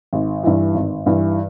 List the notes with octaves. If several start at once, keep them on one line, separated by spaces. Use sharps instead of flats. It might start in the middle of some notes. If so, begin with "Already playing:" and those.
G#1
G2 E3
G#1
G2 E3